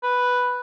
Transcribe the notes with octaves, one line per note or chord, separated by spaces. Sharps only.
B4